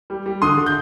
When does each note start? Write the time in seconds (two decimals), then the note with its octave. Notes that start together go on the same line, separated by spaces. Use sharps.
0.10 G3
0.26 G3
0.42 D3 C6 D#6
0.58 D3
0.66 G6